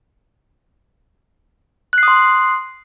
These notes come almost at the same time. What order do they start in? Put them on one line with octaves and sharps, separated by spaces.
F#6 C7 D#6 C6